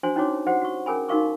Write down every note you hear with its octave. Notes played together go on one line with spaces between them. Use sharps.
D4 F#4 C5 G#5 C6
C#4 D#4 E4 F#4 C#5 D6
F#4 G4 C5 F#5
F#4 C#6
C#4 G#4 A#4 G#5 B5
D#4 F#4 A#4 F5 C#6 D6